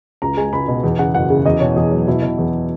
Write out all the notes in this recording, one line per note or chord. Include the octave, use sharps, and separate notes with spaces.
C#2 A#5
G#3 G#5
C#2 B5
B2
E2
C#3 F#5
F#1 F#5
C#3
E2 D#5
B2 C#5
E2 G#4
F#3
B2 E4
B2
E2